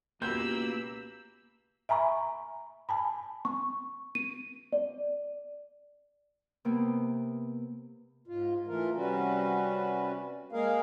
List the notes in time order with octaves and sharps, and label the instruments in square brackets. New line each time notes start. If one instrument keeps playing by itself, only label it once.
[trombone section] C#2 B2 G4 [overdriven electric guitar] A#3 [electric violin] B5 E6 [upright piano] G6
[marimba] E5 G#5 A#5 B5 C#6
G#5 A5 B5
[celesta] C#6
D#7
D5
[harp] C3 A#3 B3
[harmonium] G#2 F4
E3 A3 F4 A#4
C3 G3 C#4 F#4 B4
G#3 A#3 G#4 A#4 F5